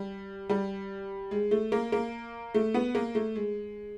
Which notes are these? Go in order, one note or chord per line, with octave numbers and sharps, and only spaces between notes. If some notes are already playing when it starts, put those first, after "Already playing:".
Already playing: G3
G3
G#3
A3
A#3
A#3
A3
B3
A#3
A3
G#3